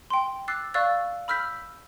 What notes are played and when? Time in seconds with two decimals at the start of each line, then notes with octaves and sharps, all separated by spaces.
0.10 G5 C6
0.48 D6 E6 F#6 A6 C7
0.74 D5 F5 C#6 E6 F#6 A6
1.28 B5 E6 F6 G6 B6